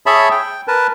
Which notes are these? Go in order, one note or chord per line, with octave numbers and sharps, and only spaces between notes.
G#4 C#5 E5 A5 B5
G5
A#4 B4 A5